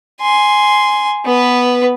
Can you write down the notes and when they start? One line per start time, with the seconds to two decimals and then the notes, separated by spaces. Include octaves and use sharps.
0.21 G#5 C6
1.26 B3 B4